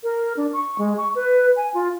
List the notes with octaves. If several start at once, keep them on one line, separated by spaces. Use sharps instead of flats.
A#4
D4
C#6
G#3
C#6
B4
G#5
F4